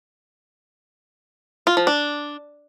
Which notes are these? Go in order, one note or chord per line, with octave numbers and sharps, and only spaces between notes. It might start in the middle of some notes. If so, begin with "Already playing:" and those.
F4
F3
D4